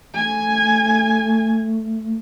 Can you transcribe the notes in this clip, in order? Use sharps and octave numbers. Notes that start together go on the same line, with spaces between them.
A3 G#5